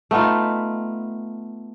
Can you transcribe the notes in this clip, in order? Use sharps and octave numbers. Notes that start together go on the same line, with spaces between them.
A3 B3 D#4 F4